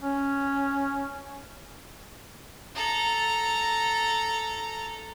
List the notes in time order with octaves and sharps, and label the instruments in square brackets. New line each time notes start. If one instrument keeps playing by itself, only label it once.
[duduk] C#4
[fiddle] A4 A#5